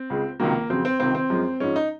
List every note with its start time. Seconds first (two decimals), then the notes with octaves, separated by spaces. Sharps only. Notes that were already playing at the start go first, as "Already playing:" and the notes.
Already playing: C4
0.10 C#2 C#3 G#3
0.40 C#2 C3 D#3 F#3 A#3
0.70 F2 C#3 F#3 C4
0.85 C4
1.00 C#2 C3 D#3 C4
1.15 C4
1.30 F#2 F3 G#3
1.60 G#2 F3 G#3 C#4
1.76 D#4